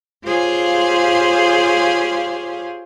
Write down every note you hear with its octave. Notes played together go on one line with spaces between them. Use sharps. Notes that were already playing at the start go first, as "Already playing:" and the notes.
F4 G4 G#4 C5 C#5 F5